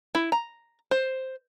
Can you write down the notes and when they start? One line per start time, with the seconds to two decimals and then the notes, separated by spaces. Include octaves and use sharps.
0.15 E4
0.32 A#5
0.91 C5